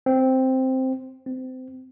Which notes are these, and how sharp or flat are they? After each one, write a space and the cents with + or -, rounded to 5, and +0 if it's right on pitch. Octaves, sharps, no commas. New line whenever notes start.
C4 +0
C4 -25